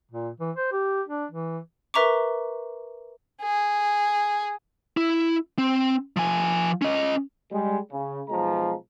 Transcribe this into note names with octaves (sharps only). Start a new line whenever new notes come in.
A#2
E3
C5
G4
D4
E3
A#4 B4 E5 A#5 C#6 D6
G#4
E4
C4
F3 G#5
C#4 D#5
G3 G#3
C#3
B1 F3 G#3 A#5